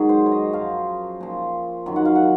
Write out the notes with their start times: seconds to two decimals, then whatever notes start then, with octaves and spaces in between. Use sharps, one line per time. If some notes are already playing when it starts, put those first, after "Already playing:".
Already playing: G#2 D#3 F#3 G#4 A#4
0.09 C5
0.26 C#5
0.32 D#5
0.53 F#2 F3 F5
1.21 A#2 F3
1.86 F#2 D#3 F#3
1.96 F#5
2.05 F5
2.15 F#5